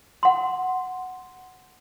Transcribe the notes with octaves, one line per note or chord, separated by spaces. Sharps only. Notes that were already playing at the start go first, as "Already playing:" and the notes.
F#5 C6